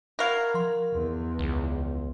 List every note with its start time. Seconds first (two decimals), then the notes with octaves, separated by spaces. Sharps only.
0.19 F#4 A#4 F5 B5 C#6 G#6
0.54 F3 C6
0.94 E2
1.39 C#2